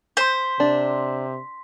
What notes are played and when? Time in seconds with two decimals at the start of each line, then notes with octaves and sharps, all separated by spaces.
0.17 C5 C6 B6
0.60 C3 D4